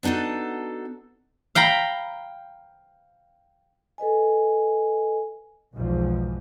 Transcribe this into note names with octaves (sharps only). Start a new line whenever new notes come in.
B3 D4 D#4 F#4 A4
F5 G5 A#5 B5
A4 B4 D#5 G#5
B1 E2 G#2 F3